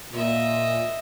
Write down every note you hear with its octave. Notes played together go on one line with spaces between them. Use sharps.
A#2 D#5 E5